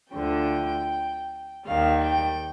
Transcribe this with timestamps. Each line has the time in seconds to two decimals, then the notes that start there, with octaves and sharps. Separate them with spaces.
0.13 D2 D3 F3 G5
1.66 D#2 D#3 G3 F5
2.04 G5